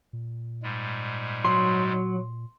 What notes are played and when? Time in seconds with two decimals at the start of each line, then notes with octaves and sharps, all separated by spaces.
0.13 A#2
0.63 G#2 G3 G#3
1.45 F#3 C6